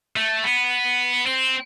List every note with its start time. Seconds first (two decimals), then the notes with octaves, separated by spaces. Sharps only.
0.16 A3
0.44 B3
1.26 C4